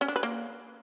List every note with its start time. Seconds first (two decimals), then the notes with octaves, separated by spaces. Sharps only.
0.01 C#4
0.08 D4
0.16 B4
0.23 A#3